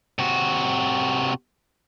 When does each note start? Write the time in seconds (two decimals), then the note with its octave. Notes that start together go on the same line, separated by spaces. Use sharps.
0.19 C3 F#4